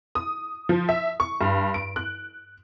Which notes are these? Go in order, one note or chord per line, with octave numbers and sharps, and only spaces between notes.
D#6
F3
E5
C#6
G2
D7
F#6